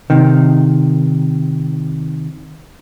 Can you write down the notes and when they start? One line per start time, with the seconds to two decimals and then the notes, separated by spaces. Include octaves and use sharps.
0.10 C3 D#3